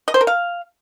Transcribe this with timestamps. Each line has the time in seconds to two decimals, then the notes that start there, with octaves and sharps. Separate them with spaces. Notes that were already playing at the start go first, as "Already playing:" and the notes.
0.08 D#5
0.14 C5
0.21 A#4
0.27 F5